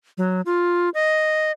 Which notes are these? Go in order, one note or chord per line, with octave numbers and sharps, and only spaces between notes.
F#3
F4
D#5